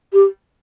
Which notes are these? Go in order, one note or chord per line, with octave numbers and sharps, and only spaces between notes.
G4